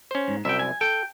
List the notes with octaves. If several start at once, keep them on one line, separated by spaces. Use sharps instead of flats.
C#4 C5
G#2
C2 F#2 E5 G5
G#5
A4 G5